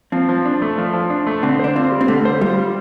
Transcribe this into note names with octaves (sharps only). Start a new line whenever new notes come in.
F3 C4
F3
D4
A3
F3
F3
D4
A3
D3 C4
D4 C5
C4 F4
G3
C4
D3 A3
C5
G3 F4
G3